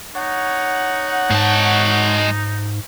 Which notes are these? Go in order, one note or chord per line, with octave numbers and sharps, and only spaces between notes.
D#4 C#5 F#5
G#2 G#3 A5